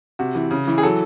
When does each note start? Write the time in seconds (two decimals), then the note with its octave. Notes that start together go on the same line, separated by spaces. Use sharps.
0.19 C3 F#4
0.35 E3
0.51 C#3
0.68 E3
0.78 G#4
0.83 F#3 A4